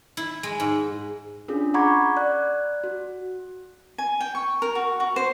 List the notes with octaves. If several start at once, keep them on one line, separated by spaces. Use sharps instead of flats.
E4
G#3
G#2
C#4 D4 F4 G#4
F#5 A#5 B5 C#6 D6 G#6
D5 F#6
F#4
G#5
G5
C#6
A#4
F#4
F#4
C5